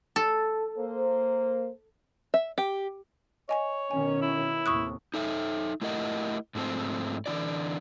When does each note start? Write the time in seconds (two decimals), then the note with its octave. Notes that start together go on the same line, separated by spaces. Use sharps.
0.16 A4
0.78 A#3 C5
2.34 E5
2.58 G4
3.49 C#5 D#5 G#5 C#6
3.91 B2 D#3 C#4 G#5
4.21 E4
4.66 D#2 A2 C3 C#6 D#6 F#6
5.14 D#4 A4 E5
5.81 A3 E4 G4 A#4 D#5 F#5
6.55 G#2 F3 A3 C4 A5
7.26 D3 E3 E4 D5